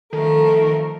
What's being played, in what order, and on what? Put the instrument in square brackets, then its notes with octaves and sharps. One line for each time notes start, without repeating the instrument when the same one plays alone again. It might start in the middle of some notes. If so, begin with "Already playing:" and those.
[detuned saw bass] D#3 [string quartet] F3 A3 A#4 [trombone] A4